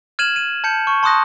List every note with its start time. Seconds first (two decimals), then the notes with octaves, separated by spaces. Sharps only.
0.19 F6 G#6 D#7 E7 F#7
0.36 D#7
0.64 A5 G6 C#7
0.87 C#6
1.03 A5 C6 C#6 D#6 F#6 A#6